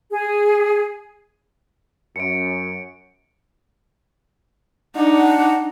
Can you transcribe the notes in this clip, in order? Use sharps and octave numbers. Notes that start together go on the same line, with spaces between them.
G#4
F#2 C#7 D7
D4 D#4 F#5